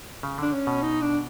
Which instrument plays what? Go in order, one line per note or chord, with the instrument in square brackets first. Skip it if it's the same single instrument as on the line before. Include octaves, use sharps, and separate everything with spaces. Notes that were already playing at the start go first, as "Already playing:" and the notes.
[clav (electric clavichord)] C#3
[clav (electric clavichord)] D3 [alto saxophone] D4
[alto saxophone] C#4
[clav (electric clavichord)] B2
[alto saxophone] D#4
D4